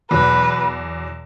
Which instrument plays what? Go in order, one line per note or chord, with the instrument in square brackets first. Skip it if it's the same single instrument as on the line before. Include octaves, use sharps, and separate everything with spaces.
[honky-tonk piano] E2 B2 F#3 [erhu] B4